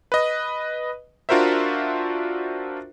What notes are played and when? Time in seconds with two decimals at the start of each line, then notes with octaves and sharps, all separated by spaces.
0.12 B4 D#5
1.29 D4 F4 F#4 A#4 C5 E5